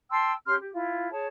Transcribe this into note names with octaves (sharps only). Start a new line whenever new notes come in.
G5 A5 C6 E6
C#4 G4 C6 F6
G4
E4 F4
G#4 C#5 A5